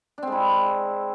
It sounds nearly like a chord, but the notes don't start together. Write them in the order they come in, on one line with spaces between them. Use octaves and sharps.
D4 C4 G#3 E4